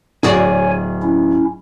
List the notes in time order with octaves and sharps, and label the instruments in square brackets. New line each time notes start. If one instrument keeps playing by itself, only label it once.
[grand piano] D1 [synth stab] F#4 G#4 D5 [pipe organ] C#5 G#5
[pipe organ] C#4 E4